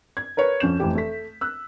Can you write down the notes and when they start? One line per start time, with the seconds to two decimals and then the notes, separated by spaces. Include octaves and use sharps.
0.17 G#6
0.37 A#4 B4 C#5
0.60 F2 C#4 G6 E7
0.80 F1 E3 G4
0.95 A3 B6
1.41 E6 F#6